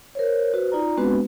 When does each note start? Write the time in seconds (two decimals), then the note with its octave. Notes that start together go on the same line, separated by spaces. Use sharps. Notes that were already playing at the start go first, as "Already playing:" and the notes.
0.15 A#4 C5 C#5
0.54 F#4 B4 C5
0.72 D#4 F4 D5 A#5
0.97 G#3 B3 C4 D4 F#4 B4